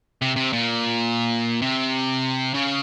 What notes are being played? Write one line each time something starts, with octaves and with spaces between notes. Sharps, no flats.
C3
C3
A#2
C3
C#3